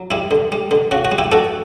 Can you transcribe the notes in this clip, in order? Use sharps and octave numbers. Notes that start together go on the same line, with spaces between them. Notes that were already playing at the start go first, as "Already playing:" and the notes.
Already playing: F#3
G3 E4
D3
G3
D3
C#3 F#4
F#4
G3
E4 G4
D4 F#4 A4